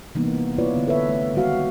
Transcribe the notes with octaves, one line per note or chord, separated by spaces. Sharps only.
C3 E3 G3 A#3 B3 D#4
E4 F4 B4 C#5 D5
D3 B3
A4 B4 C#5 E5
A3
D#3 G3 G#3 F#4 F5